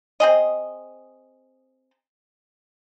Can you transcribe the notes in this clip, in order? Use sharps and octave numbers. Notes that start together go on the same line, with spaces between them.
C4 G#4 D#5